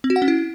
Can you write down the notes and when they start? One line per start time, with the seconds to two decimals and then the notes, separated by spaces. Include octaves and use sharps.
0.04 C4
0.10 F#4
0.16 F#5
0.22 C#4
0.28 E4